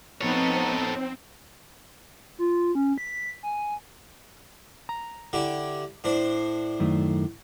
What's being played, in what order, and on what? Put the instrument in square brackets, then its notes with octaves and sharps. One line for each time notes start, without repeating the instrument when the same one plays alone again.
[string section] F3 B3 D#4 [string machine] C4 [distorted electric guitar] A4 C#5
[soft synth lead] F4
C#4
B6
G#5
[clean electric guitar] A#5
[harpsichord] D3 E4 G4
A2 D4 C5
[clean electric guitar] F#2 D#3 A3